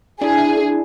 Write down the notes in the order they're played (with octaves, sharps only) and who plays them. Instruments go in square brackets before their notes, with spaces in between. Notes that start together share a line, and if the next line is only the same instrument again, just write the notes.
[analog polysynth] D4 E4 [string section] G#4